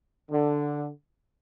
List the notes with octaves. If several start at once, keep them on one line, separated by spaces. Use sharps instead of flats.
D3